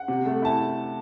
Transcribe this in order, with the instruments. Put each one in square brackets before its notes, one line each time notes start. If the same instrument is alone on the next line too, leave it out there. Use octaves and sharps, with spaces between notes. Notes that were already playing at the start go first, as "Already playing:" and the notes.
Already playing: [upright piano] F#5
C3
A3
E4 A5